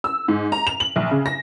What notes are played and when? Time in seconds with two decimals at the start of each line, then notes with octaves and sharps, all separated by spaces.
0.04 E6
0.28 G#2
0.52 A#5
0.67 F7
0.80 F#7
0.96 A#1
1.11 C#3
1.26 A#6